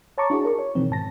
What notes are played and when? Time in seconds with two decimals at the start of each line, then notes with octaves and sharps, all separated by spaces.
0.18 C#5 A5 A#5 C#6 D6
0.30 D4 E4 F#4 G#4
0.45 A#4 C#6
0.59 C#5
0.75 B2 D#3 E3 C4
0.91 G#2 A5 A#6